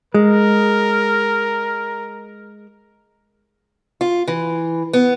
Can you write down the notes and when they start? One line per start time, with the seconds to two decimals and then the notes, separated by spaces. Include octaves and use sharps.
0.14 G#3 A#4
4.01 F4
4.28 E3
4.93 B3